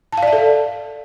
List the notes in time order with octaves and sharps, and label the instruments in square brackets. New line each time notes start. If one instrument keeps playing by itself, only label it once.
[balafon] A5
F5
D5
E5
A4